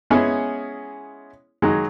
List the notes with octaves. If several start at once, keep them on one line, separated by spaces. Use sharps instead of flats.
G#3 B3 C#4 E4 G#4
D#3 F#3 G#3